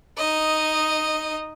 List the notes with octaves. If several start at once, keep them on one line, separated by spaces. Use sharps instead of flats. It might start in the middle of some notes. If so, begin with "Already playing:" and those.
D#4 D#5